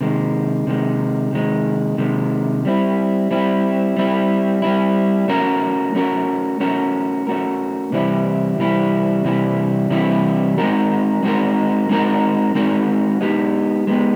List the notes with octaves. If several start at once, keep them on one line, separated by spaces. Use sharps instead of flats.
C3 D#3 G#3
C3 D#3 G#3
C3 D#3 G#3
C3 D#3 G#3
G3 C4 E4
G3 C4 E4
G3 C4 E4
G3 C4 E4
A3 C#4 F#4 A#4
A3 C#4 F#4 A#4
A3 C#4 F#4 A#4
A3 C#4 F#4 A#4
C3 E3 G3 C4 E4
C3 E3 G3 C4 E4
C3 E3 G3 C4 E4
C3 E3 G3 C4 E4
G#3 C4 D#4 F#4 A#4
G#3 C4 D#4 F#4 A#4
G#3 C4 D#4 F#4 A#4
G#3 C4 D#4 F#4 A#4
G#3 B3 D#4 G4
G#3 B3 D#4 G4